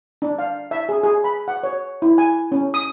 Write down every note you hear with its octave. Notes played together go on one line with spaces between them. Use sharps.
D4
F5
E5
G#4
G#4
B5
F#5
C#5
E4
G#5
C#4
D#6